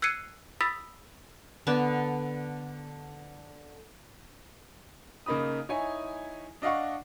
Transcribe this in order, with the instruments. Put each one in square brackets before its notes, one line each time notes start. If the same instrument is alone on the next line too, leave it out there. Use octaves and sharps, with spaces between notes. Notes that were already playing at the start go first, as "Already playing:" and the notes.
[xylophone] E6 F#6 G#6 C7 C#7 D#7
B5 D#6 E6 A6 B6
[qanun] D3 B3 D4 A5
[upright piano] C#3 A#3 D#4 B5 D#6
D#4 E4 C#5 G#5
D4 D#5 F5 F#5 C#6